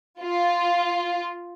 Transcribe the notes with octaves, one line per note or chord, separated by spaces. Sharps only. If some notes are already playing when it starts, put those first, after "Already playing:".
F4